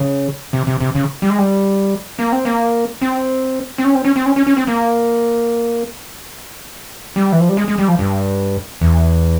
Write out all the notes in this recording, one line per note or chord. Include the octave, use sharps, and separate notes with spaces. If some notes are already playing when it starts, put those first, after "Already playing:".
Already playing: C#3
C3
C3
C3
C#3
G3
G#3
G3
A#3
C4
A#3
C4
C4
C#4
C4
C#4
C4
C#4
C#4
C#4
C4
A#3
G3
E3
F3
G3
G#3
G#3
G3
F3
G2
E2